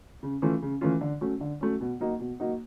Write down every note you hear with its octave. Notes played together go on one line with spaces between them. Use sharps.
C#3
E3 A3 C#4 F4
C#3
E3 A3 C#4 F4
D3
F#3 A3 C#4
D3
F#3 A3 C#4
B2
F#3 A#3 D#4 F#4
B2
F#3 A#3 D#4 F#4